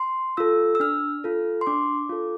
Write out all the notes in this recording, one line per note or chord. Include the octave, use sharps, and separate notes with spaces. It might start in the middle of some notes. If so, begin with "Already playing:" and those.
Already playing: C6
F4 A4 E6
E6
D4 F6
F4 A4
C6
D4 D6
F4 A4